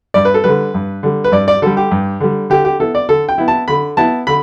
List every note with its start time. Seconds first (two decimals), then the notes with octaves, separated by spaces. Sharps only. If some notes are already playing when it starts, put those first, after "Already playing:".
0.14 G2 D5
0.25 B4
0.34 A4
0.44 D3 G3 B4
0.74 G2
1.03 D3 G3
1.24 B4
1.32 G2 D5
1.48 D5
1.62 D3 G3 A4
1.77 G4
1.91 G2
2.20 D3 G3
2.50 D3 G4
2.65 G4
2.80 B3 E4 A4
2.95 D5
3.09 D3 A4
3.29 G5
3.38 B3 E4
3.48 A5
3.68 D3 B5
3.97 B3 E4 A5
4.27 D3 B5